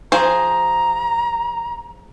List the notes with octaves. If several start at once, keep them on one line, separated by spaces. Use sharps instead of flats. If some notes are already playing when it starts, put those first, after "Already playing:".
F3 G#4 C5 A#5